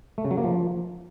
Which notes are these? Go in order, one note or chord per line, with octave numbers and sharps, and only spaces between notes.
A3
C#3
F#3
A#3
F3